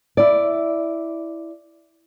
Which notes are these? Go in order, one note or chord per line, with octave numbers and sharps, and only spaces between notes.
E4 D5